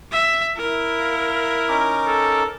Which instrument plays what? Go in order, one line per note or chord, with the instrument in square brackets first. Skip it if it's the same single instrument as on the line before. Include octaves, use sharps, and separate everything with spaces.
[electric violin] E5
[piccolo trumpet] E4 [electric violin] A#4
[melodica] F5
C#4 D#4 D6
[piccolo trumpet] A4